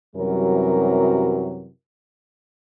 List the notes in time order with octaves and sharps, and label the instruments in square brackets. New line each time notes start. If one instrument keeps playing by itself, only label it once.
[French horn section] F#2 C3 E3 F#3 G3 A#4